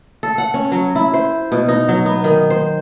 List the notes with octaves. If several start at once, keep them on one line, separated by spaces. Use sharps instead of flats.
A4
F#5
C#4
F#3
E4
C5
B2
D#4
F#3
B3
D#3
C5